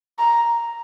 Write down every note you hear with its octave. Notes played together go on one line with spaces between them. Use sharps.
A#5